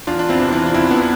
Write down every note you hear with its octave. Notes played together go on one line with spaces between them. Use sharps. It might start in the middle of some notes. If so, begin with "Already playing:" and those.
E2 D4 F4
D4
C4 E4
C3 E3
C4 E4
F4
E2 C4 E4
B3 D4